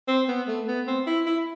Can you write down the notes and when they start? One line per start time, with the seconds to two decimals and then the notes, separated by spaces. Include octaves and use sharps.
0.08 C4
0.28 B3
0.48 A3
0.67 B3
0.87 C4
1.07 E4
1.26 E4